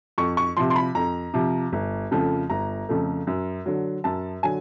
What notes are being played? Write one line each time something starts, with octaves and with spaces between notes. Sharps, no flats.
F2 C#6
C#6
C3 F3 C6
C6
B5
F2 A#5
C3 F3
G1
F2 C#3 F3 A3
G1 A#5
F2 C#3 F3 A3
F#2
D3 F#3
F#2 A5
D3 F#3 G#5